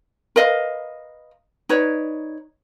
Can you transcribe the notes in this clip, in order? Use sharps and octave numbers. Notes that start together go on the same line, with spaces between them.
A#4 B4 D#5 F5
D#4 B4 C#5 D5